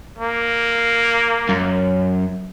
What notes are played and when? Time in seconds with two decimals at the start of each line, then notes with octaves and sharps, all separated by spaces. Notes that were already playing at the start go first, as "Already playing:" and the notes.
0.18 A#3
1.49 F#2